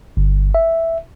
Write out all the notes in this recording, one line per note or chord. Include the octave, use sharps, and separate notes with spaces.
G1
E5